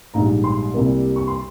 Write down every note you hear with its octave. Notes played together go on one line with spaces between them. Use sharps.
A#1 G#2 G3 A#5
C6
C2 C3 G3 A#3
C#6
C6